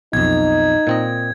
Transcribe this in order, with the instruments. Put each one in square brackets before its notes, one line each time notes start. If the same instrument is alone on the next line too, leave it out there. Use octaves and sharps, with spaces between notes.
[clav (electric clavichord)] B1 F2 [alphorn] D#4 [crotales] G#6
[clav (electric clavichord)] A#2 C4 D#5